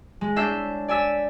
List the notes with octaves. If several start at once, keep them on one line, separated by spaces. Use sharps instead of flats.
G#3
C#4 D4 E5 G6 C7
D5 G#5 E6 B6